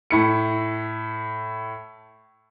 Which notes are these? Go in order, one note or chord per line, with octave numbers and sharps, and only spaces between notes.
A2 E4 C#7